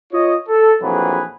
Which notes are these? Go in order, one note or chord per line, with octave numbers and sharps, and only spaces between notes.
F4 C#5 D#5
A4
A#1 F2 E3 F#3 G#4 B4